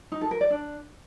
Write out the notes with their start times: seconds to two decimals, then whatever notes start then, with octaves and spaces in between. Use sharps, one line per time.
0.12 D#4
0.21 A4
0.31 A#4
0.41 D5
0.50 D4